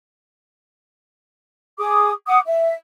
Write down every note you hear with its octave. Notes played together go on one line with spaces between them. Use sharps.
G#4 D6 D#6
F#5 D6 D#6
E5